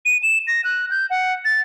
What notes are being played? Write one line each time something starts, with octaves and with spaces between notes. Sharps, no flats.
D#7
E7
A#6
F#6
G6
F#5
A6